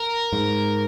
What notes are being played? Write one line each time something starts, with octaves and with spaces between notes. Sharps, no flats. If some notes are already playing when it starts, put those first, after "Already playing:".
Already playing: A#4
G#2